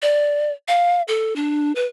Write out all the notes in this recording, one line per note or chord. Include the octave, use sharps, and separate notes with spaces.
D5
F5
A4
D4
B4